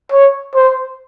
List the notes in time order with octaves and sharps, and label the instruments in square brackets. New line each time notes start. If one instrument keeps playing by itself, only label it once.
[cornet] C#5
C5